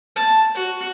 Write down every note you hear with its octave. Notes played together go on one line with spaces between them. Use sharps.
A5
F#4